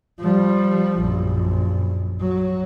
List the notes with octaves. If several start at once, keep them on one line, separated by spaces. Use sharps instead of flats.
F3 G3
A#1 F#2
F#3